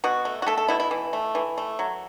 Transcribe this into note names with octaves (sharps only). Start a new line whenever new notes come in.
B2 F#4
A3
F#4
A3 A4
A4
B2 E4
E4
E3
A3
E3
A3
F#3